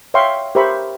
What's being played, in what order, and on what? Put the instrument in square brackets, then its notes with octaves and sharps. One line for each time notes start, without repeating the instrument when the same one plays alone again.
[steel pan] C#5 E5 F5 G5 C6 C#6
G4 A#4 C5 E5 B5 C#6